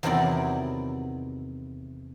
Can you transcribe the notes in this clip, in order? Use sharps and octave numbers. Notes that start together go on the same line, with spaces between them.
E2 C3 D#3 F#3 E4 D5